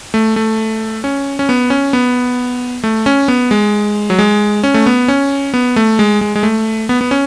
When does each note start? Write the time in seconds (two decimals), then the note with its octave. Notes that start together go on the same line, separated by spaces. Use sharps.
0.14 A3
0.36 A3
1.04 C#4
1.39 C#4
1.49 B3
1.70 C#4
1.93 B3
2.84 A3
3.06 C#4
3.28 B3
3.51 G#3
4.10 F#3
4.19 G#3
4.63 C#4
4.74 A3
4.86 B3
5.08 C#4
5.54 B3
5.76 A3
5.99 G#3
6.21 G#3
6.36 G#3
6.43 A3
6.89 B3
7.01 B3
7.11 C#4